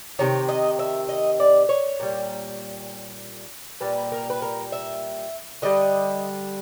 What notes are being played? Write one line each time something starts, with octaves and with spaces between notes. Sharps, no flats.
C3 D#3 C#5
D#5
E5
D#5
D5
C#5
A#2 G3
A#2 G3 B4
A#4
B4
A#4
E5
D3 G3 D#5